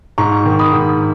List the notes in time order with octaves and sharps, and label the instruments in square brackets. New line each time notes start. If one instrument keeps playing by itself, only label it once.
[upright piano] G#2 A#5 C#6
D#3
B5 D#6
G#2